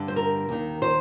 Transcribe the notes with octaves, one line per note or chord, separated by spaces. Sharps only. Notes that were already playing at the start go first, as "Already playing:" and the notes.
Already playing: G2 D3
C5
A#4
D#2 D#3
C5